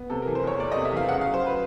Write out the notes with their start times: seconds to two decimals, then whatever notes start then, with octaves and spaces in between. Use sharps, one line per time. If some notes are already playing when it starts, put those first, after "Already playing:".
Already playing: B3
0.10 C3 A4
0.22 A#4
0.27 E3
0.35 C5
0.43 E2 C#5
0.59 A3 D5
0.72 D#5
0.76 C3
0.85 E5
0.93 E3 F5
1.08 C#3 F#5
1.21 F5
1.26 F#3
1.34 C5
1.46 B4